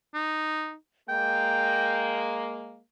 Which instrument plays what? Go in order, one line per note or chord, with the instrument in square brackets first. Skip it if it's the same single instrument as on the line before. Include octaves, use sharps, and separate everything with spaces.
[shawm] D#4
[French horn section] G#3 A#3 [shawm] G5